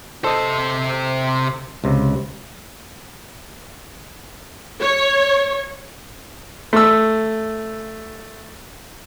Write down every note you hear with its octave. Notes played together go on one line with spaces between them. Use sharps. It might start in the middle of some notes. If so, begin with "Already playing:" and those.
C3 A4 C5 D#5
C#2 C3
C#5
A3 E6